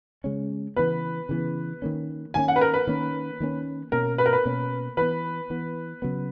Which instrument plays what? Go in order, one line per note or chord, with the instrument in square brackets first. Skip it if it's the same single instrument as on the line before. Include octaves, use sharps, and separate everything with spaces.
[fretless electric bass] C#3 G#3 C#4
[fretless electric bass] C#3 E3 B3 [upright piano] B4
[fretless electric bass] C#3 E3 B3
D#3 A#3 C#4
[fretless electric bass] D#3 A#3 C#4 [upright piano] G#5
[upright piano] F#5
B4
A#4
B4
[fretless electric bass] D#3 A#3 C#4
D#3 A#3 C#4
[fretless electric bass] B2 A#3 C#4 [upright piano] A#4
[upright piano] B4
A#4
B4
[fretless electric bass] B2 A#3 C#4
[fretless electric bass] E3 B3 [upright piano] B4
[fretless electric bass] E3 B3
C#3 F#3 B3